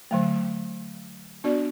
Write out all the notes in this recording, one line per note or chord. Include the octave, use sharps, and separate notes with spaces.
D3 F#3 A3
B3 D4 F#4 D5